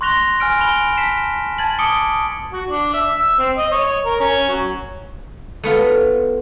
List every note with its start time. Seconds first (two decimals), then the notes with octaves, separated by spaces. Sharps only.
0.01 C6 C#6 F#6 A#6 F7 G7
0.40 G#5 F6 D7
0.60 B5 D7 F7 G7
0.97 A5 B6 C7 E7
1.58 A5 G#6 A6 F#7
1.79 A5 D6 D#6 C#7 D7 G7
2.52 F#4
2.70 D4
2.94 E5
3.19 E6
3.39 C4
3.57 D#5
3.72 C#5
4.05 A#4
4.20 C#4
4.49 F#3
5.64 A3 B3 F4